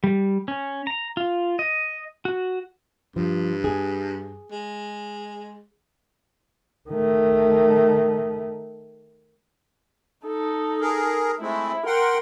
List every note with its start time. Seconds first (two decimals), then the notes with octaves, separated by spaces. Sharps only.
0.04 G3
0.48 C#4
0.87 A#5
1.17 F4
1.59 D#5
2.25 F#4
3.16 G2 F3
3.64 G#4
4.51 G#3
6.90 D#3 A3
10.27 D#4 A4
10.81 G#4 A#4
11.40 G#3 A3 C4 E4
11.86 A#4 F#5 G5 C6